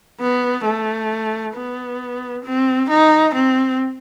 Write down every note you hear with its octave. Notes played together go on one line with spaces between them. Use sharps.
B3
A3
B3
C4
D#4
C4